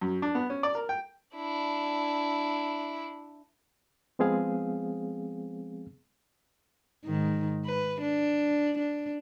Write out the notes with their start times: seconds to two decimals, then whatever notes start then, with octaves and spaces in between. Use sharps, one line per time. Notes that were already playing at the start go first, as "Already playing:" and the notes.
0.01 F#2
0.22 D4
0.35 B3
0.50 C#4
0.63 D5
0.75 A#4
0.89 G5
1.34 D4 E4
4.19 F3 G#3 B3 C4 G#4 F5
7.05 G#2 D#3
7.65 B4
8.01 D4
8.78 D4